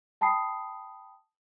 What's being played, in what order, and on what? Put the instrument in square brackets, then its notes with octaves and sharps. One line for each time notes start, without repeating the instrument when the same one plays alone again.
[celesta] G5 A5 B5 D#6 C7